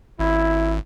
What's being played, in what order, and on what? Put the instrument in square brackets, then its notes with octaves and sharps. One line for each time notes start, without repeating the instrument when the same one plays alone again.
[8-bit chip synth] G#1 [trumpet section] E4